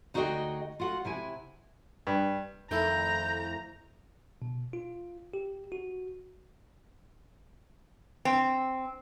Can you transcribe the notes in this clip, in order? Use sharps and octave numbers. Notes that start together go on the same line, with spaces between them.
D2 D#4 F#4 G#4 D#5 G5
F4 F#4 F#5
C3 E4 G#5
G2
F2 D#3 A3 E4 A#5 G6
B2
F4
G4
F#4
C4